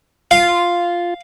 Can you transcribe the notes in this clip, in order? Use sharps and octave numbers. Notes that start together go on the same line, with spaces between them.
F4 F5